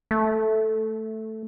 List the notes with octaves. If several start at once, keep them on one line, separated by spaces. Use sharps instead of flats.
A3